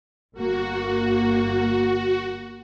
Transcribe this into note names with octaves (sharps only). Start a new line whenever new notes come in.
G1 A#3 F#4